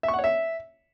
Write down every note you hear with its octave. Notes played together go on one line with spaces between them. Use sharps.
E5
C#6
F#5
C#5
E5